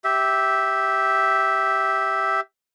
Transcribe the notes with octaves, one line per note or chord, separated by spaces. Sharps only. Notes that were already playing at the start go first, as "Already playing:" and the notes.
G4 E5